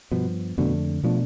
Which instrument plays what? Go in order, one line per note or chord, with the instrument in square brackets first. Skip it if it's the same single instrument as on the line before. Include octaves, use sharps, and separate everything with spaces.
[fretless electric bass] G2 F3 B3 [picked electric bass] B2
[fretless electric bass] F2 D3 A3 D4 [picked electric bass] B2
[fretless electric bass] B2 A3 D4 [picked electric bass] F3